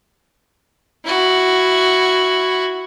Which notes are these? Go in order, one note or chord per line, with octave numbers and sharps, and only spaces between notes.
E4 F#4